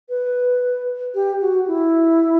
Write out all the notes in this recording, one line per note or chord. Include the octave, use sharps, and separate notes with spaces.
B4
G4
F#4
E4